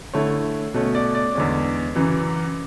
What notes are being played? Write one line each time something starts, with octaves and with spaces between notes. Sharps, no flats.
D3 A3 E4 C#5
B2 A3 C#4
D5
D5
E2 D3 G#3 C#4
F#2 C#3 E3